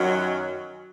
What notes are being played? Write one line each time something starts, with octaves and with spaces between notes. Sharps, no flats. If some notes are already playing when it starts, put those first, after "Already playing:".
Already playing: F#2 D#3 F#3 C#4